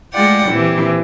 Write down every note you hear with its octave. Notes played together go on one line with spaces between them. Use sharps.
G#3 A3 F4 D5 F#5 G5
A#2 E3 C4 G4